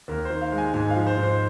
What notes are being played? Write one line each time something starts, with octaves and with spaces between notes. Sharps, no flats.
D#2 A#4
D#3 C5
F5
G#3
G#5
G#2 G#5
F5
F3
C5
G#2
C5